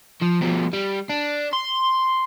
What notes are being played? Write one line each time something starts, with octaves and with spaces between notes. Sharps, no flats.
F3
B2 F3
G3
D4
C6